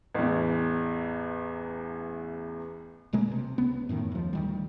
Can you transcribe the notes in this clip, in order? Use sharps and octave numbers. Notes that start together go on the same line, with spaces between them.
A1 E2
G#1 B2 G#3 A#3
C3
C#2 B3
F#2 A2 D3 D#3
D#2 F3
D2 D#3 G3